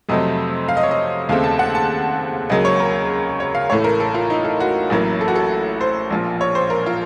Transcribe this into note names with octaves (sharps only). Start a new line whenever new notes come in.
F2 C3 F#3 A3 C4 D#5
F5
D#5
C#5
D#5
D#2 C#3 A3 C4 F5
A5
F#5
A5
C#2 C#3 F#3 A#3 D#5
C#5
A#4
C#5
F5
A1 A2 A3 C#5
A#4
A4
F4
D#4
A4
F#4
A1 A2 F#3 A#3
A4
F#4
A4
C5
A#1 A#2 F3
C#5
C5
A#4
F4